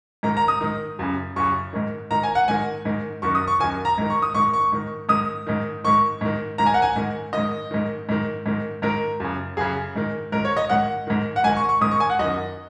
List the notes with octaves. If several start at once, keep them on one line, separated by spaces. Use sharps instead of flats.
G#2 D#3 A#5
A#5
D#6
G#2 D#3
F#2 C#3
F#2 C#3 C#6
G#2 D#3
G#2 D#3 A#5
G#5
F#5
G#2 D#3 G#5
G#2 D#3
F#2 D#3 C#6
D#6
C#6
F#2 D#3 G#5
A#5
G#2 D#3
C#6
D#6
G#2 D#3 C#6
C#6
G#2 D#3
G#2 D#3 D#6
G#2 D#3
G#2 D#3 C#6
G#2 D#3
G#2 D#3 A#5
G#5
F#5
G#5
G#2 D#3
G#2 D#3 D#5
G#2 D#3
G#2 D#3
G#2 D#3
G#2 D#3 A#4
F#2 C#3
F#2 C#3 G#4
G#2 D#3
G#2 D#3 A#4
C#5
D#5
G#2 D#3 F#5
G#2 D#3
F#5
G#2 D#3 G#5
C#6
C#6
G#2 D#3 D#6
C#6
G#5
F#5
F#2 D#3 D#5